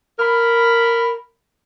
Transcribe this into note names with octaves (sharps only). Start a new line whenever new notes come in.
A#4 B5